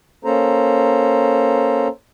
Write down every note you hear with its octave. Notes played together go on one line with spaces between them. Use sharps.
A#3 C#4 A4 C5 A#5